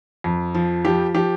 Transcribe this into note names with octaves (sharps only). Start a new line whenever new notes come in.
F2
F3
F3 G4
F3 G4